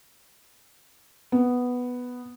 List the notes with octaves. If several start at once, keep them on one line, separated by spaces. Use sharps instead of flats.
B3